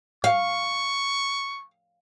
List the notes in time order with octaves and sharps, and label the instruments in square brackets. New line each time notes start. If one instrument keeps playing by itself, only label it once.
[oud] F5 [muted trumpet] C#6